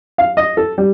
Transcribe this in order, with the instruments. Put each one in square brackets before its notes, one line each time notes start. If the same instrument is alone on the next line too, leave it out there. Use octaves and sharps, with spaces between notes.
[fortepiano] F5
D#5
A4
G3